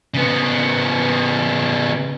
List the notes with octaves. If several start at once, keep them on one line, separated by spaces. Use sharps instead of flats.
C#3 B3